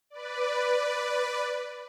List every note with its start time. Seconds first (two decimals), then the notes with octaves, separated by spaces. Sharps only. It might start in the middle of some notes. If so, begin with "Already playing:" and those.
0.10 B4 D5